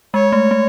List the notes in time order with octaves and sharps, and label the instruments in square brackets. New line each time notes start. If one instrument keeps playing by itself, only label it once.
[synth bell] G#3 [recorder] C#5
[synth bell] A3
A3